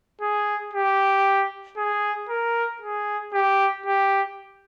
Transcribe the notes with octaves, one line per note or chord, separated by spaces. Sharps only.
G#4
G4
G#4
A#4
G#4
G4
G4